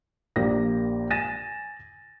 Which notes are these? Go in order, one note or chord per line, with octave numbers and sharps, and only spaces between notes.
A#1 A#3 G4 A#6
G#5 A6 A#6 D#7 E7